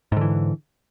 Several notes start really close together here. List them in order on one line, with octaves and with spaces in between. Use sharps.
G#2 D3 E3